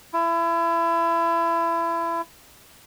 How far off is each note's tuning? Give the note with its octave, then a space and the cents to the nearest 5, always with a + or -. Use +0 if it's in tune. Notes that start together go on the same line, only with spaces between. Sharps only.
E4 +30